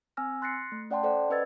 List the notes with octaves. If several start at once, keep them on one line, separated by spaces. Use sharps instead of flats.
C4 G#5 E6 F6 A#6
C6 F#6 A6 A#6 C7 C#7
A3
C#4 D5 F#5 G5 A5 C6
A4 C5 D5 F#5
C#4 B4 D#5 E6 G#6 A6